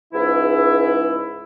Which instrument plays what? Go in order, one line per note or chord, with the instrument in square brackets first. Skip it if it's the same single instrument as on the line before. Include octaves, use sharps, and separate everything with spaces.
[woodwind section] C#2 G#2 E3 E4